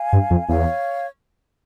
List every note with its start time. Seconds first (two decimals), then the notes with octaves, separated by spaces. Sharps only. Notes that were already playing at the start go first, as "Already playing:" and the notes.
Already playing: F5 G#5
0.13 G2
0.30 F2
0.49 E2 C#5 F5